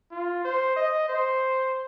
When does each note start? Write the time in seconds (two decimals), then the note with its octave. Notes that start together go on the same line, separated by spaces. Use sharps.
0.11 F4
0.45 C5
0.76 D#5
1.08 C5